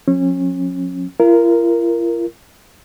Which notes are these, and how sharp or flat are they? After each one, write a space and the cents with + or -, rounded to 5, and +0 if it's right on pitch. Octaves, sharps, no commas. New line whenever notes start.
F3 +45 C#4 -30
F4 -45 A#4 +0